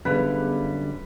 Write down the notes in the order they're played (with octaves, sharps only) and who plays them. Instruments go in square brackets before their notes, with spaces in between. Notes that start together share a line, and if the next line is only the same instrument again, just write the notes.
[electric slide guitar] F#2 D3 G3 [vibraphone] B3 G#4 F5 [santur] B4